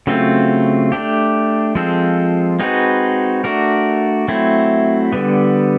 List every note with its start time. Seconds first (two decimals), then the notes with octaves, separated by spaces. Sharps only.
0.07 C#3 F#3 A3 C4 F4
0.92 A3 D4 G4
1.75 F3 G#3 C4 F4 A4
2.60 G#3 C4 D#4 F#4 B4
3.44 A3 D4 F#4 A#4
4.28 F#3 A3 C4 E4
5.13 D3 G3 B3